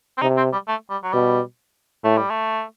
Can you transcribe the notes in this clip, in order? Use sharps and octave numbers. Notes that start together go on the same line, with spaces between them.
C4
C3 D#4
C4
G3
A3
G3
F#3
B2 G3
A2 A3
G3
A3